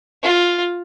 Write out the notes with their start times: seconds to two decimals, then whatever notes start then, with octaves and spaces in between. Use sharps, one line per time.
0.23 F4